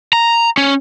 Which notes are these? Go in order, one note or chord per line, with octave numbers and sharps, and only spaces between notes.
A#5
C#4